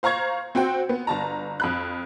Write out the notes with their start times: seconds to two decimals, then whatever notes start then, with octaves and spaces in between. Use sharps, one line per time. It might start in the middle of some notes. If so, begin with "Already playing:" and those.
0.03 C5 F5 A#5 C#6 G#6
0.55 C4 F#4 C5 G5
0.89 B3
1.07 G1 A5 A#5
1.60 F2 B5 F#6